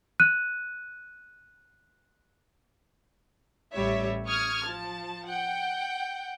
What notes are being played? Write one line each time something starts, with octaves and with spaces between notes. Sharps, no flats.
F#6 D#7
A1 G3 C#5 E5
C#6 D#6 F6 G#6
F3 A5
F#5 G5